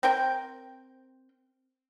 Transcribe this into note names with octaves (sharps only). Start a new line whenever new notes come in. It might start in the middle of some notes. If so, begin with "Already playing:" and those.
C4 A#4 G5